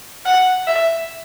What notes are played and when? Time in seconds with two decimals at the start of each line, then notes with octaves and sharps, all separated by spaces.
0.26 F#5
0.67 E5